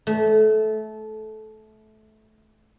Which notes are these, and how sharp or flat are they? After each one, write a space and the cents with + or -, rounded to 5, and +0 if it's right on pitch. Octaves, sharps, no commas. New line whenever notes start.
A3 -20